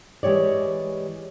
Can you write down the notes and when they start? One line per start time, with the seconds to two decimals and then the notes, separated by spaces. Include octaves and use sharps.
0.23 E3 G#3 G4 C#5 D5